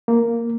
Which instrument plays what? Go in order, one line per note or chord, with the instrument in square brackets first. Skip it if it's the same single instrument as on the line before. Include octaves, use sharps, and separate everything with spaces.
[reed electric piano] A#3